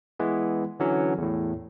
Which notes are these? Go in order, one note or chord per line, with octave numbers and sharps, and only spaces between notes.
E3 G#3 B3
D3 E3 F#3 C#4
E2 A2